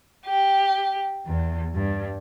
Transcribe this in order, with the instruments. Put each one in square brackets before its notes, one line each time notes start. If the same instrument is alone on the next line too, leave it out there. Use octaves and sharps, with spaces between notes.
[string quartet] G4
E2
G2